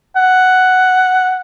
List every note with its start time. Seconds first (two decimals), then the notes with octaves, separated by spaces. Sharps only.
0.16 F#5